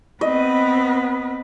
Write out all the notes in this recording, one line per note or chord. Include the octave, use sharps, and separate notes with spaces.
B3 C4 B4 D#5